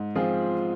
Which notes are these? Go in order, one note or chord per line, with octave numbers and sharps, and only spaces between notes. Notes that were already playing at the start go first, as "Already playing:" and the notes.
Already playing: G#2
F3 C4 F4 G#4